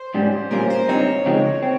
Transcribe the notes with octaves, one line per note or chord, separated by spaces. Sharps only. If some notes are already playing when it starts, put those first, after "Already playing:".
Already playing: C5
G#2 G3 C#4
A#2 G3 C#4 F4 A#4
C5
G2 G3 C4 D#4 C#5
C#3 F3 G#3 C4 D#4
C4